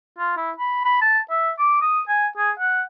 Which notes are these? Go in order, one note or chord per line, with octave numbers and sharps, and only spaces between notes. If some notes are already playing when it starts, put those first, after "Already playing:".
F4
E4
B5
B5
A5
E5
D6
D#6
G#5
G#4
F#5